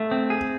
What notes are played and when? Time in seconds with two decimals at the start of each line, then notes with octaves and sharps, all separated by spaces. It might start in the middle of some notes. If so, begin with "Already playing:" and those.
Already playing: A3 B6
0.11 C4
0.30 G#4